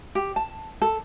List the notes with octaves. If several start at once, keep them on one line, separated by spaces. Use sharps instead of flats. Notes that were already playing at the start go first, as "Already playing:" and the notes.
G4
A5
A4